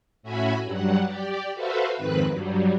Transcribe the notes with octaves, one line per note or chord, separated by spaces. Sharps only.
A2 C#4 F#4 E5 G#5 B5
G2 F#3 G3 F#5
G4 D5
F#4 A4 B4 C5 E5 F5
F2 G#2 D#3 C4 B4 F#6
G2 F#3 G3